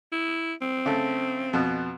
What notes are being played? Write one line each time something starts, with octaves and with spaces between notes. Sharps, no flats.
E4
C4
C#3 A3
F2 B2